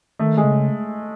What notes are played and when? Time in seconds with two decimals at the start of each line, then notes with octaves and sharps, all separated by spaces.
0.19 D#3 A3
0.37 G#3
0.44 C#3